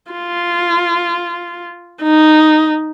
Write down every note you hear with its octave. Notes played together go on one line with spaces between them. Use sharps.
F4
D#4